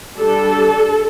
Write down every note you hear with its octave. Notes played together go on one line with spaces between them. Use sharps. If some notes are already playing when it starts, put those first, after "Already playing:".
G3 D4 A4